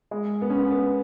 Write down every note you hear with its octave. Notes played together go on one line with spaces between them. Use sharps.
G#3
B3
C#4
B3
B3